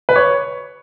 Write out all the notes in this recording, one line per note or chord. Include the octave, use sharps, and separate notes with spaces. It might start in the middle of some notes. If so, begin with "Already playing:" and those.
B4
C#5